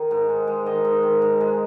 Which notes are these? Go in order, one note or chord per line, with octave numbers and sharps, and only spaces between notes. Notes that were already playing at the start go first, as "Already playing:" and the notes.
Already playing: D#3
G#2
G#3
G#3
D#3 D#5
G#2
D#3
G#2
G#3